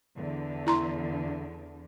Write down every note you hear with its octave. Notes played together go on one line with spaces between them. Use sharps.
E2 D3
E4 A#5 C6